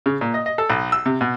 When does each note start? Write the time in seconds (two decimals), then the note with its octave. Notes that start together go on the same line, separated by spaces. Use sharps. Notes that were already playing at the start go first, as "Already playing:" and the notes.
0.06 C#3
0.21 A#2
0.34 D#5
0.46 D#5
0.58 A4
0.70 B1
0.92 E6
1.06 C3
1.21 B2